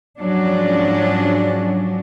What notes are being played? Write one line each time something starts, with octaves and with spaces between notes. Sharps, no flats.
G#2 F3 F#3 C#4 D4